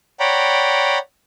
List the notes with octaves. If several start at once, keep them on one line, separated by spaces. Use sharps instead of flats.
C#5 D5 F#5 G5 A#5 B5